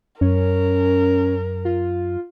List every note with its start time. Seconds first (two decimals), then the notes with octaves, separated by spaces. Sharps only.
0.21 F#2 C#4 A#4
1.65 F4